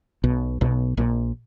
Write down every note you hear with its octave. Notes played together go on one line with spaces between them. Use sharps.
B1 B2
B1 B2
A#1 A#2